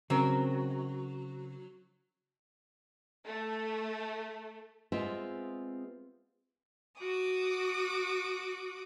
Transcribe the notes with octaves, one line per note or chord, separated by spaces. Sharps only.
C#3 F#3 C4 A#4
A3
G#3 B3 C4 F4 G#4 E5
F#4 D6 D#6